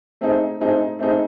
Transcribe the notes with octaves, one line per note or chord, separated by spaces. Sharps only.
A3 C4 D#4 G#4
A3 C4 D#4 G#4
A3 C4 D#4 G#4